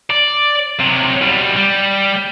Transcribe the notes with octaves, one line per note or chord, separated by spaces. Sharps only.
D5
C3 F#3
B2 G3
G3